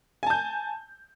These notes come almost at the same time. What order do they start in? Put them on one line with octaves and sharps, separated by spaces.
G#5 A5 G6